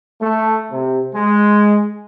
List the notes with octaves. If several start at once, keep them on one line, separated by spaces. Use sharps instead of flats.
A3
C3
G#3